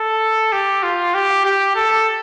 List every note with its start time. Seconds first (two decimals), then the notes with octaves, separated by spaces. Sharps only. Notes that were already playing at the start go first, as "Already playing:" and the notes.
Already playing: A4
0.52 G4
0.83 F4
1.14 G4
1.45 G4
1.76 A4